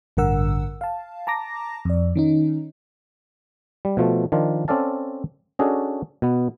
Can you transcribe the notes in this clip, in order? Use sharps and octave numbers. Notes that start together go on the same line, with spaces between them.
A1 G2 D3 A#4 F#5 E6
F5 A5
A5 A#5 D6 A#6
F2 D5
D#3 C#4 D#4
G3
B2 F3 A3
D#3 F3 D4 F4
C4 C#4 A4 D5 F5 A5
C#4 D4 F#4 G#4 A4 D#5
B2 B3